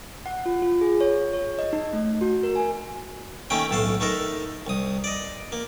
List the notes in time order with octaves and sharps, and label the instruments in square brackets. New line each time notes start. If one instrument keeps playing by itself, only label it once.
[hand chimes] F#5
F4
F4
G#4
C#5
C#5
D#5
D#4
A3
F#4
A#4
G#5
[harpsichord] D#3 A3 A#3 C#4 G5
B1 A2 A4 F5
A3 D#4 A4 A#4
C2 D#6
D5 D#5
A#3